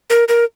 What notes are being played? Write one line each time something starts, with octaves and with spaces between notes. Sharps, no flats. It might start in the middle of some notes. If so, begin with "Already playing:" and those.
A#4
A#4